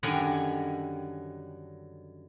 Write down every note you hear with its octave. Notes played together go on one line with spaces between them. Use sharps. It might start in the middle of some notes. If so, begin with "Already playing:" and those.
F#2 D3 D#3 G3 C#5 G#5